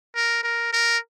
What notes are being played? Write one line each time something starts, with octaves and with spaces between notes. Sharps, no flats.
A#4
A#4
A#4